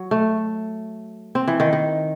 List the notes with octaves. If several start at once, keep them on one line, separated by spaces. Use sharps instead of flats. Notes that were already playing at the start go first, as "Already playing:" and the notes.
Already playing: F#3
A3
C4
E3
D#3
D#3